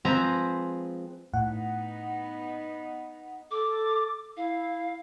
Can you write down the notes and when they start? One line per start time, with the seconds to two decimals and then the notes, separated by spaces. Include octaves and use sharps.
0.05 F3 G#3 C4 B4 G#5 A#5
1.34 A2 B3 D#4 F#5
3.51 A4 D6
4.37 E4 F5